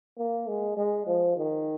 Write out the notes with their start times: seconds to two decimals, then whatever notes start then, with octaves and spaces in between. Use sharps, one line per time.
0.18 A#3
0.47 G#3
0.77 G#3
1.07 F3
1.37 D#3